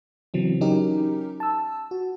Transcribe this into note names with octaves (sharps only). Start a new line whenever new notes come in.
C#3 E3 F#3 C4
F#3 C#4 D#4 G4 A#4
A5 E6
F#4